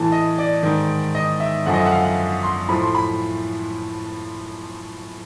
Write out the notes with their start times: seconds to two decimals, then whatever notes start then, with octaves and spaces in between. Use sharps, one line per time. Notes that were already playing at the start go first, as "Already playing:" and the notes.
Already playing: A2 E3 A5
0.12 D#5
0.38 D5
0.63 G#2 D#3
1.15 D#5
1.40 E5
1.66 F#2 D3 F3 F#5
1.74 D#5
1.79 E5
1.86 F#5
1.92 F5
2.05 F#5
2.43 C6
2.69 A2 F3 B5
2.82 C6
2.95 B5